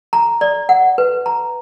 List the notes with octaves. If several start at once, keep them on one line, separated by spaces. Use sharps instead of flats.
A#5
D5
F#5
B4
A#5